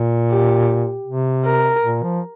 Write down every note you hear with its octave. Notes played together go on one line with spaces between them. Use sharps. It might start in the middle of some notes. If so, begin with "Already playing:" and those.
Already playing: A#2
G4
C3
A#4
A#2
F3